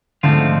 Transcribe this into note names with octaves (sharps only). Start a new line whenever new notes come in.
G#2 D3 F3 A3 C4 F4